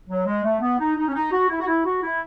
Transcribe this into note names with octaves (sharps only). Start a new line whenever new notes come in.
F#3
G#3
A3
B3
D#4
D#4
C#4
D#4
F#4
E4
F#4
E4
F#4
E4